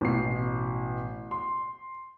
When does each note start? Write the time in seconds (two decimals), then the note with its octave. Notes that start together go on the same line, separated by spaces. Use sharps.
0.01 A1 B2 C7
1.31 C6